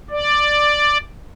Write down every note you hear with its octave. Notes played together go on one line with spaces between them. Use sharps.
D5